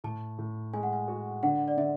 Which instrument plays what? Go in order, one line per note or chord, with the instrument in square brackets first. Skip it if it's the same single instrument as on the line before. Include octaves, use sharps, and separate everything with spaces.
[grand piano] A2 [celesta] A5
[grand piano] A2
[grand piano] G#3 [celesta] G#5
[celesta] F#5
G#5
[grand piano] F#4
[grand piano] D3 [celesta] F#5
[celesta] D5
[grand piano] D3 [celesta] E5